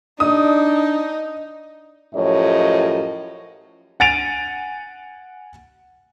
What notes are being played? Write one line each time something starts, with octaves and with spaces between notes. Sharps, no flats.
D4 D#4 D#6
F#2 A2 F3 G4 C#5 D#5
F#5 G#5 A6 D7 D#7 F7